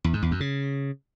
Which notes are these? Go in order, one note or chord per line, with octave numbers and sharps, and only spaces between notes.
E2
G#2
E2
F#2
C#3